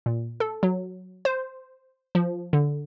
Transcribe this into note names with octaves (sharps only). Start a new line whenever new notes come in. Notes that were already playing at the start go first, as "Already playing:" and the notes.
A#2
A4
F#3
C5
F3
D3